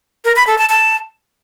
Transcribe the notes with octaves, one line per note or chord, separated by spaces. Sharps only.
A#4
B5
A4
A5
A5